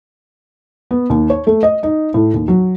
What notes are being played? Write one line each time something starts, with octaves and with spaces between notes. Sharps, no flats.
B3
D#2
C#5
A3
D#5
D#4
A2
D#2
F#3